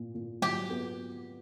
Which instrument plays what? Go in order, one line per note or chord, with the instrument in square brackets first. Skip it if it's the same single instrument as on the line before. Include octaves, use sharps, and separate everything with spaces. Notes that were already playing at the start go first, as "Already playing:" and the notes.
Already playing: [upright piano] A#2
A#2
[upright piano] F#3 [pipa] G4
[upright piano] B3